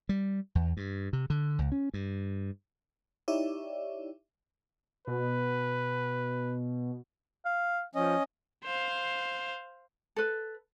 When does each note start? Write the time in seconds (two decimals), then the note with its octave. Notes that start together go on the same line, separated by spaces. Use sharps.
0.09 G3
0.55 E2
0.77 G2
1.13 C3
1.30 D3
1.59 C#2
1.72 C#4
1.94 G2
3.28 D#4 E4 G4 C#5 D5 E5
5.07 B2 B4
7.45 F5
7.95 F3 C#4 D#5
8.64 C5 F5
10.16 A4 B4